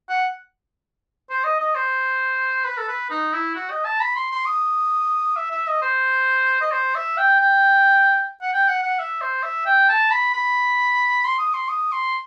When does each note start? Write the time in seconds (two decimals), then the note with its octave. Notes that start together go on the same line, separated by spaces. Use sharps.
0.09 F#5
1.30 C5
1.44 D#5
1.60 D#5
1.75 C5
2.65 B4
2.77 A4
2.88 B4
3.10 D#4
3.33 E4
3.55 F#4
3.70 D#5
3.85 A5
4.00 B5
4.16 C6
4.31 C6
4.46 D#6
5.37 E5
5.51 E5
5.67 D#5
5.82 C5
6.61 D#5
6.72 C5
6.95 E5
7.17 G5
7.40 G5
8.42 F#5
8.53 G5
8.68 F#5
8.83 F#5
8.99 E5
9.21 C5
9.43 E5
9.66 G5
9.89 A5
10.11 B5
10.34 B5
11.24 C6
11.38 D#6
11.54 C6
11.69 D#6
11.92 C6